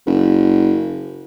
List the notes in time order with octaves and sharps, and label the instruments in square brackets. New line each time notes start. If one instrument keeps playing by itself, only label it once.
[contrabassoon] F#1